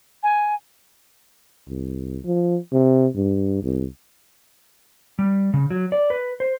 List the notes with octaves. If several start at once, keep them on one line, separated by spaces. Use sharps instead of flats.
G#5
C2
F3
C3
G2
C2
G3
C#3
F#3
D5
B4
C5